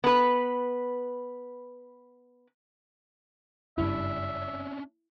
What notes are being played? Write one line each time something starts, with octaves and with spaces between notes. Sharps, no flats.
B3 B4
F#1 G2 C#4 D4 E4 E5